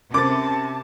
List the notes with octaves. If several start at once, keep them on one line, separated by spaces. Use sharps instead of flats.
C3 C#4 A5 D6 A6